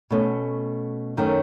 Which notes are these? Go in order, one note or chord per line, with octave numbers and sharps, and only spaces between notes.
B2 A3 C#4
F#2 D#3 A3 C#4